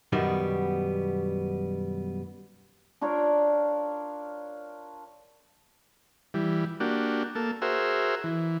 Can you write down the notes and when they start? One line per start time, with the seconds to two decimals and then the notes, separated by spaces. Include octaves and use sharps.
0.13 F#2 B2 D#3 G3 B3
3.01 D4 F4 A#4 C#5
6.34 E3 G3
6.80 A#3 D4 F#4 G4
7.35 A#3 A4
7.62 F#4 G#4 A#4 C5 E5
8.24 E3